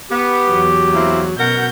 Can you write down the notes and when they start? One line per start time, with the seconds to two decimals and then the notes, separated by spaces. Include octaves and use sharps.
0.11 B3 G4
0.48 E2 F#3
0.94 A#3 C4 E4
1.39 F#2 B2 A#4 F#5 G6